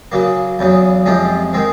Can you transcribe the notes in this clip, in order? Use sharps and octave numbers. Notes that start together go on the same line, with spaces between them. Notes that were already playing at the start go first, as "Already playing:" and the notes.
C#3 F#3 A#3
E2 C#3 F#3
F2 C3 F3 G#3 C#4
D#3 G#3 C4